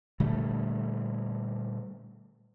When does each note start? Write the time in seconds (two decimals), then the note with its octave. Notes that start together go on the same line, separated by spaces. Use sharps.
0.20 A#2 D3 G3 A3